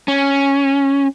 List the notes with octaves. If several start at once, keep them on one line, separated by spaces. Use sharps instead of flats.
C#4